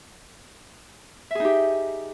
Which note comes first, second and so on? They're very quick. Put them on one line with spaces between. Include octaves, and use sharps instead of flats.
E5 G#4 D#4 G4